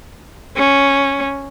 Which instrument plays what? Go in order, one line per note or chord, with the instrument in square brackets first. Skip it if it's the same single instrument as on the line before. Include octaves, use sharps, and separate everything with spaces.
[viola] C#4